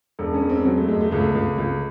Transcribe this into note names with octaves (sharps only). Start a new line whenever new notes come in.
E1 A4
C#4
E1
C4
C#4
F#3 C4
A3
E1 G#3
A3
C#2 A3
C#2
C#2